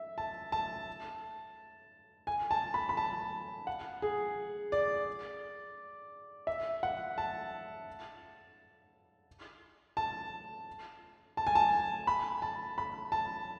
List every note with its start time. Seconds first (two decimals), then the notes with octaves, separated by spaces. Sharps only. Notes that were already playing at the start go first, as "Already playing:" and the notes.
Already playing: E5
0.18 A5
0.52 A5
2.27 G#5
2.51 A5
2.74 B5
2.89 B5
2.97 A5
3.67 F#5
4.02 G#4
4.72 D5
6.47 E5
6.83 F#5
7.18 A5
9.97 A5
11.37 A5
11.47 G#5
11.55 A5
12.07 B5
12.42 A5
12.78 B5
13.12 A5